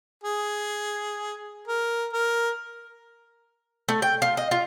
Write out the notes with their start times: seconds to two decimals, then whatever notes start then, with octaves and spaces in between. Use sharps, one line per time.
0.24 G#4
1.68 A#4
2.13 A#4
3.88 A3
4.02 G5
4.22 F4
4.37 D#5
4.51 F4